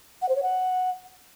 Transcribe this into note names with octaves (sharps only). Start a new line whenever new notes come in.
F#5
C5
C#5
F#5